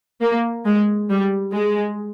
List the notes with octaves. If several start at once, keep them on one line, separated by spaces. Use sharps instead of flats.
A#3
G#3
G3
G#3